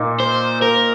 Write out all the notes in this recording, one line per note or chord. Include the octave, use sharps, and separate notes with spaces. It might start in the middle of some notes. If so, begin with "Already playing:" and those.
Already playing: A#2 A#3 D#4
C5
A#4